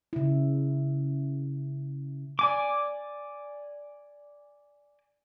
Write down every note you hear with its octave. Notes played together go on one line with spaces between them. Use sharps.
C#3 E4
D5 G#5 D6